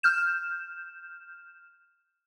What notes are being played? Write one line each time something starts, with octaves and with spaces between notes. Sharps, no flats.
F6 G6 E7